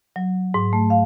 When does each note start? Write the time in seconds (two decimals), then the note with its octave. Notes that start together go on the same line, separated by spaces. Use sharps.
0.16 F#3
0.54 G#2
0.73 A3
0.90 F5